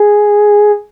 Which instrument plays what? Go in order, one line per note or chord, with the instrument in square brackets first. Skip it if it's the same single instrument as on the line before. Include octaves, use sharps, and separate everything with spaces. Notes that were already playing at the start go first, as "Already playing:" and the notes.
Already playing: [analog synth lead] G#4